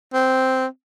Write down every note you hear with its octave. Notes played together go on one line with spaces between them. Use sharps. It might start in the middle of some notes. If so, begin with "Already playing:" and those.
C4